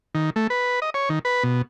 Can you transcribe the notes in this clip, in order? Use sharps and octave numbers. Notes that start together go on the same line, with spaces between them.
D#3
A3
B4
D#5
C#5
D#3
B4
B2